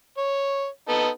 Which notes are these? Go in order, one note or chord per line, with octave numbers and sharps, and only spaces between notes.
C#5
B3 D#4 A4